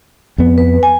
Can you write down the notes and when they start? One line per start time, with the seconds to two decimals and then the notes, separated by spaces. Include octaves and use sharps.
0.38 F2 B3
0.58 B4
0.83 G#5